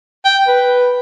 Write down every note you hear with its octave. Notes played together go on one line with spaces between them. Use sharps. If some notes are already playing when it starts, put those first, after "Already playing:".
G5
B4